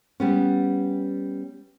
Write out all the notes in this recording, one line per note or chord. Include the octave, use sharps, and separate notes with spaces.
G3 B3 C#4